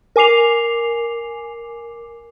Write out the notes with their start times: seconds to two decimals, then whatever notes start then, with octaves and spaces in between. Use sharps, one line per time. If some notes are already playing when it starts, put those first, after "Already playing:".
0.16 A#4 G#5 D6 C7 F7